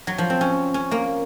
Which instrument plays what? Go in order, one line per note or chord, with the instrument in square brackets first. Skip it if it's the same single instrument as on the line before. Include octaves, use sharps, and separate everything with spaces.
[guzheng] F#3
F3
C4
C#4
C#4
A#3